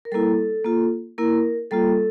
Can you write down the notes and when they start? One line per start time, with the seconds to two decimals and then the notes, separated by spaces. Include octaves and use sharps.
0.05 A#4
0.12 G3 A#3 E4 A4
0.65 A#3 F4
1.18 A#3 E4 A#4
1.71 G3 A#3 F4 A4